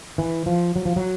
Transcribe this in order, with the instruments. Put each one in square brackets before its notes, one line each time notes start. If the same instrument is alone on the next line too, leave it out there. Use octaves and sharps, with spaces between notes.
[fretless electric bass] E3
F3
F#3
F3
F#3